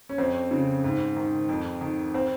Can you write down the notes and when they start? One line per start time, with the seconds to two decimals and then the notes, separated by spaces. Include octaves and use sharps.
0.09 C#4
0.18 F2 C4
0.51 C#3
0.84 G#2
1.17 D#3
1.49 F2
1.81 D#3
2.14 C4